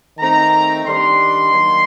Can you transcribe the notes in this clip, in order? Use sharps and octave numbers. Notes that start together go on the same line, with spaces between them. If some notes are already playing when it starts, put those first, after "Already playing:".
D#3 A3 C4 D#4 A#5
D#3 G3 D4 C6
D#3 F#3 A#3